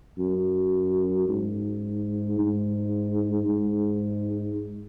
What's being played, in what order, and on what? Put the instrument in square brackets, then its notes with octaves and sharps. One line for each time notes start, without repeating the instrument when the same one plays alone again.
[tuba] F#2
G#2
G#2
G#2